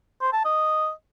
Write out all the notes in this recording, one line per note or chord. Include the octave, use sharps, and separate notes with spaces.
C5
A5
D#5